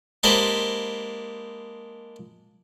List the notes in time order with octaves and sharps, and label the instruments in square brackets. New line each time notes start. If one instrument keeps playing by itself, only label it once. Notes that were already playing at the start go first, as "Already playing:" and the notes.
[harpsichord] G#3 A#3 D4 G4 B4 C5